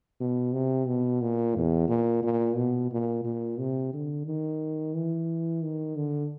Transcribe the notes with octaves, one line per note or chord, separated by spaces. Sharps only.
B2
C3
B2
A#2
E2
A#2
A#2
B2
A#2
A#2
C3
D3
D#3
E3
D#3
D3